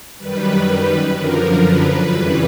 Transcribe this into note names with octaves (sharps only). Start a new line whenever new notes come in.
F#2 D#3 G3 B4
F#2 D3 F3 A#4
B4
F2 C#3 E3 G3